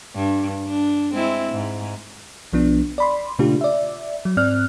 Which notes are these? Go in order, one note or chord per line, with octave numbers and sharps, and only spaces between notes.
G2
D4
G#3 C4 E4
G#2
B1 F3 B3 D4
D5 B5 C6
A#2 C#3 A3 D4 F4 G4
D5 E5
F#3
G#2 C4 D5 F6 F#6